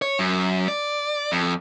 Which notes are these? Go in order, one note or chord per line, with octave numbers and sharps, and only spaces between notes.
C#5
F#2
D5
F2